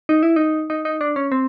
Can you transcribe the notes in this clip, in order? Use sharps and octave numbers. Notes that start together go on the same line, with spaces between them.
D#4
E4
D#4
D#4
D#4
D4
C#4
C4